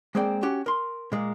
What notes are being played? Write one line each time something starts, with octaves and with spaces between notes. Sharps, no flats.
G#3 A#3 C4 D5 G5
C#4 F#4 G4
A#4 C6
A#2 G#3 A#3